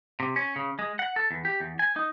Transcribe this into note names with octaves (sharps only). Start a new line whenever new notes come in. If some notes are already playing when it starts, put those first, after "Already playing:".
C3
C#4
C#3
G#3
F#5
A4
E2
G4
E2
G#5
D#4